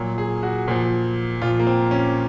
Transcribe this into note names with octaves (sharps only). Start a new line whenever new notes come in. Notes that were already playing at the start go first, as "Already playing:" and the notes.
Already playing: A#2 F#3
G#4
F#4
A#2 F3
A#2 F3 F4
A#3
C4
C#4